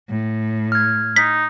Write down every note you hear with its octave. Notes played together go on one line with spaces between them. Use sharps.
A2
F6 G#6
D#4 B6